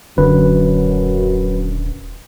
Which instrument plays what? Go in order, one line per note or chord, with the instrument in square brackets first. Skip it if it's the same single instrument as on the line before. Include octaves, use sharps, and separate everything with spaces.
[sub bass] D#1 [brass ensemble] F#2 [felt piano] D3 [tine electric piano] B4